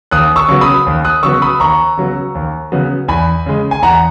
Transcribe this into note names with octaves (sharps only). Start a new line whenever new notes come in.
D#2 D#6 F#6
C#6 E6
C#3 F#3 B3
B5 D#6
D#2
D#6 F#6
C#3 F#3 B3 C#6 E6
B5 D#6
D#2 A#5 C#6
C#3 F#3 B3
D#2
C#3 F#3 B3
E2 G#5 B5
C#3 G#3
G#5
E2 F#5 A#5